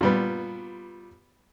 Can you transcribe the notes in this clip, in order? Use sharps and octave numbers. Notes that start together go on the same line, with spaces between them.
A#2 G3 B3